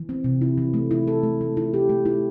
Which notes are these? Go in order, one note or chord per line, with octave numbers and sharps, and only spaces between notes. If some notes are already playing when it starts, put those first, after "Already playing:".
Already playing: E3
C4
C3
E4
E3
A3
E4
A4
A3
A3
E4
G4
A3
E4